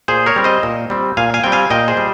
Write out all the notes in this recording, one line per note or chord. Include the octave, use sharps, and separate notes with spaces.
A#2 G#4 C5
A#4 C#5
G3 C4
C5 D#5
A#2
G3 C4
A#2 F5 G#5
F5 G#5
G3 C4 G5
F5 G#5
A#2 D#5 G5
G#4 C5
G3